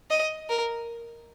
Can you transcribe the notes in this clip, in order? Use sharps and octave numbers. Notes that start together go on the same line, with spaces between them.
D#5
A#4